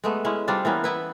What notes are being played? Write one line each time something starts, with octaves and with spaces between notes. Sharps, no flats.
G#3 A3 B3
G#3 C#4 E4
G3 C4 D4 F4
E3 A#3 B3 C#4
B3 E4 B4